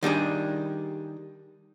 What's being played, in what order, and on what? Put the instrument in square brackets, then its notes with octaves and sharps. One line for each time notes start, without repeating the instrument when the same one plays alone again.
[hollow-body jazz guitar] D#3 G3 D4 G#4